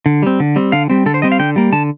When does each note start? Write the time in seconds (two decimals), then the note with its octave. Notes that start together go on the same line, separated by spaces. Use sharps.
0.06 D3
0.23 G3 C4
0.40 D3
0.56 G3 C4
0.72 D3 F5
0.90 G3 C4
1.06 D3 A4
1.14 C5
1.22 G3 C4 D#5
1.32 F5
1.39 D3 G5
1.56 G3 A#3
1.73 D3 A5